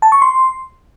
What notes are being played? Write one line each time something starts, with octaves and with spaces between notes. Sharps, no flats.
A5
C#6
C6